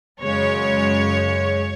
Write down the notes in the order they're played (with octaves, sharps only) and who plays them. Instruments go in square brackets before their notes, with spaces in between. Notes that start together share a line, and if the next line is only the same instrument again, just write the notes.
[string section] F#2 C#3 G#3 C#5